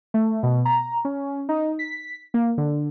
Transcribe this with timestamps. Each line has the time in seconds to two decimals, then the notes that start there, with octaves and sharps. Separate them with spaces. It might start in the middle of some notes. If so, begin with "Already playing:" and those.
0.14 A3
0.43 B2
0.65 A#5
1.05 C#4
1.49 D#4
1.79 B6
2.34 A#3
2.57 D3